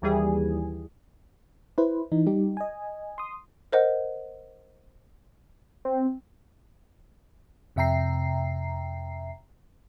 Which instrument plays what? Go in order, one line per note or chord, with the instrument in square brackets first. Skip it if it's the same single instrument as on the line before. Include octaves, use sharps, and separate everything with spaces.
[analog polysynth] D#2 E3 G3 G#4
[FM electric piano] E4 B4 C5
E3 D#4
G3 D#4 G4
D#5 G#5
C6 D#6
[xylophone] A#4 C5 D#5 F#5
[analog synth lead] C4
[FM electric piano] F2 C3 E5 G5 A#5 C7